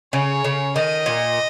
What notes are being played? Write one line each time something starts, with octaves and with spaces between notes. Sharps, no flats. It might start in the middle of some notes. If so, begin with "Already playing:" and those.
C#3 C#5
C#3
D#3 D#5
A#2